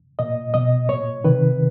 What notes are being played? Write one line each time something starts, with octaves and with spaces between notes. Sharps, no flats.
A#2 D#5
B2 D#5
A#2 C#5
C3 D#3 B4